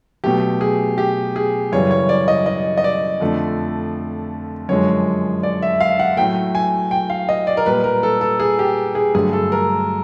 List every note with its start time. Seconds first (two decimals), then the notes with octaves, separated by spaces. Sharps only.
0.24 B2 F#3 A3 G4
0.61 G#4
0.98 G4
1.36 G#4
1.72 F#2 C#3 E3 G3 C#5
1.91 C#5
2.09 D5
2.28 D#5
2.46 D#5
2.78 D#5
2.84 D5
3.20 F2 D3 F3 A3
4.69 F#2 D3 F3 G#3 C#5
5.43 D5
5.62 E5
5.81 F5
5.99 F#5
6.17 A2 F#3 A3 G5
6.55 G#5
6.91 G5
7.10 F5
7.29 D#5
7.47 D5
7.57 A#4
7.66 A#2 G3 B4
7.84 A#4
8.03 A4
8.21 A4
8.40 G#4
8.59 G4
8.95 G#4
9.14 G2 D3 F#3 A3 G#4
9.33 A4
9.52 A#4